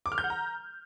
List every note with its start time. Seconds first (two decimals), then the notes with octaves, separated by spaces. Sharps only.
0.06 D6
0.12 F6
0.18 G6
0.24 F#5
0.30 A#5